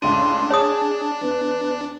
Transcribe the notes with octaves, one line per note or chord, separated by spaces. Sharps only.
C#2 A2 D4 C6 D#7
G#4 C#5 A5 D#6
E2 B4